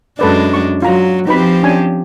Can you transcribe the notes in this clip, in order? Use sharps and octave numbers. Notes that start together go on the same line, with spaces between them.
F#2 G#3 D4 A4 B4 D5
C#6
F#3 F4 A#5
F3 C4 D#4 G4 B4 B5
C#4 D4 G#5